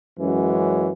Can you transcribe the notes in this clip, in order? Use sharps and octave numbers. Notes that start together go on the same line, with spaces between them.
F#2 E3 G#3 C#4 F#4